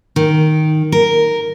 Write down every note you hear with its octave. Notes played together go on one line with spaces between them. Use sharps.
D#3
A#4